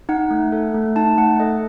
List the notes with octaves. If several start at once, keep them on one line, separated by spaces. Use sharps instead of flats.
D#4 F#5
A3
A4
A3
D#4 A5
A3 F#5
A4 D#5